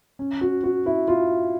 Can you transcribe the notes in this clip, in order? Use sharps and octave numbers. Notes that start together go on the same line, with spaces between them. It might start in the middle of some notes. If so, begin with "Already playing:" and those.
C#4
F#4
F#4
E4
F4